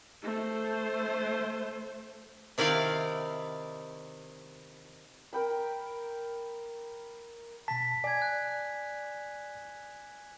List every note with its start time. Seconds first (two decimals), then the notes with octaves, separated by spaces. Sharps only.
0.23 A3 C5
2.58 C3 D#3 E4 D5 F5
5.33 A#4 G5 B5
7.68 B2 A5 B6
8.04 D5 G#5 G#6
8.22 F#6